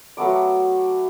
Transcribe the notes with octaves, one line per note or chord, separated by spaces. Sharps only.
F#3 A3 B3 D6